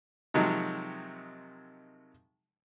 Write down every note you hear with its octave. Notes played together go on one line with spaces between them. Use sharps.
C3 D#3 F3 F#3 G#3